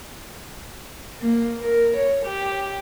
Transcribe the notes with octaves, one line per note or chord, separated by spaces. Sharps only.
A#3
A#4
C#5
G4